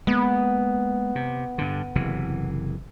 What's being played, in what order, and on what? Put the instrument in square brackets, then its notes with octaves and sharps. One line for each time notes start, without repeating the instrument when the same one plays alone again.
[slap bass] G#3 A#3 [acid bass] B3
[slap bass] C3
G2 D3
F#1 C3 E3